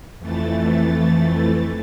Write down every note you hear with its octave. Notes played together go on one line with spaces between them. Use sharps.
F2 E3 A3 A6